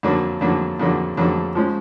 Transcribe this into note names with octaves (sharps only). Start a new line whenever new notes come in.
F2 D3 F#3 A#3
F2 D3 F#3 A#3
F2 D3 F#3 A#3
F2 D3 F#3 A#3
F3 G#3 C#4